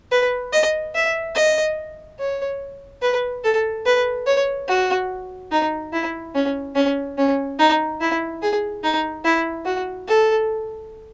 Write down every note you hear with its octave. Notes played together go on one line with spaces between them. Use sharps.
B4
D#5
E5
D#5
C#5
B4
A4
B4
C#5
F#4
D#4
E4
C#4
C#4
C#4
D#4
E4
G#4
D#4
E4
F#4
A4